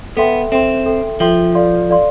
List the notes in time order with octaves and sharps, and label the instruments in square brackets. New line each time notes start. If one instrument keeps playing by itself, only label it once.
[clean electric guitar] B3 [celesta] A4 E5 G5 C6
[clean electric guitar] C4 [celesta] A4 E5 G5 C6
[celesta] A4 E5 G5 C6
[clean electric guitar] F3 [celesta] A4 E5 G5 C6
[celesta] A4 D5 F5 C6
A4 D5 F5 C6